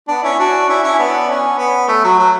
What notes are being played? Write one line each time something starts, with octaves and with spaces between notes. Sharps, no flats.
B3 D4
C#4 E4
D4 F#4
C#4 E4
C#4 E4
B3 D4
C#4
B3
A3
F#3
F#3